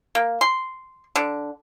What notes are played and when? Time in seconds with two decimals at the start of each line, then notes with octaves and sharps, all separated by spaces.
0.15 A#3
0.41 C6
1.16 D3